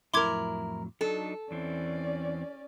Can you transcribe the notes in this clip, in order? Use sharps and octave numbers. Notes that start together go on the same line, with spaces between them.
F2 A2 F#3 E4 A#4 C6 D6 G#6
F#3 D4 D#4 A4
E2 E3 C4 C#4 D5